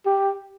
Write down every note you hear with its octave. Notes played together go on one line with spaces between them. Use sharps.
G4